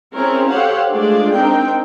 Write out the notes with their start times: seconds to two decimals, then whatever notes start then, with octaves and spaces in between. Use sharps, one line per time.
0.14 C4 C#4 E4 G#4 A#4 C#5
0.49 G4 A4 C5 C#5 F5 F#5
0.91 G#3 A3 D4 F4 G#4 D5
1.34 C4 D4 D#4 A#4 G5